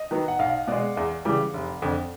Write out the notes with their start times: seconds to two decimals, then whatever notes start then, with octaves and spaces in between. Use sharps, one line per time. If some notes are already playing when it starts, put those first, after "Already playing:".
Already playing: D#5
0.11 D#3 F#3 B3
0.28 F#5
0.39 B1 F5
0.68 B2 G#3 D5
0.97 E2
1.25 C#3 E3 G3
1.54 F1
1.82 F2 D3